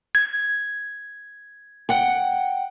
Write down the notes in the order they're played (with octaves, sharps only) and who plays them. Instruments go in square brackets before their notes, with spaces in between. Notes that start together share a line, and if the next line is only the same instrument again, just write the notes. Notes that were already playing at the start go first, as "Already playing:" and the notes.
[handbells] G#6
[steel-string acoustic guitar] F#5 G5